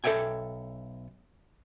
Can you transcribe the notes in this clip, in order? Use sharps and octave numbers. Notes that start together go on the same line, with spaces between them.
B1 A4 C5 E5 G5 G#5